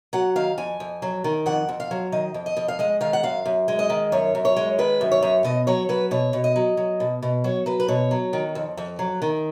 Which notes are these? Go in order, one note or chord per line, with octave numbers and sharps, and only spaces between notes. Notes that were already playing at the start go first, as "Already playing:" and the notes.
F#3 F#5
D#3 F5
F2 G#5
F2
F#3
D#3
F2 F#5
F2
F5
F#3
D#3 D#5
F2
D#5
F2
F5
G#3 D#5
D#3 F5
F#5
F#2 F5
F#2
G#3
D#5
D#3
F#2 C#5
F#2
C#5
G#3
D#3 B4
F#2
C#5
F#2
B2 D#5
F#3 C#5
F#3 B4
B2 C#5
B2
D#5
F#3
F#3
B2
B2
F#3 C#5
F#3 B4
B4
B2 C#5
F#3
D#3
F2
F2
F#3
D#3